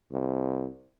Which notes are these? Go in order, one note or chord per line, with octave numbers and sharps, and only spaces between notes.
C2